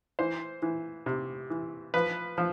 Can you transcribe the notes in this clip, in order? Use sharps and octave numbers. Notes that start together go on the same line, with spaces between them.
E3 C5
E3
C3
E3
F3 B4
F3